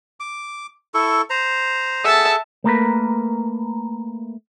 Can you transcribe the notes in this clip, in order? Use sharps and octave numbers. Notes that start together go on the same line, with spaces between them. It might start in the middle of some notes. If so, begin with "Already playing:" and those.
D6
E4 A4 C#6
C5 A#5
G#4 A4 E5 F#5 A5
A3 A#3 A#4 B4